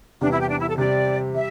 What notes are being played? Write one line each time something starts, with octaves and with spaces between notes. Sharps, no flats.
E2 C3 E3 G3 D4
E4
G4
D4
E4
A4
C3 G3 C4 G4 D5
G3 E5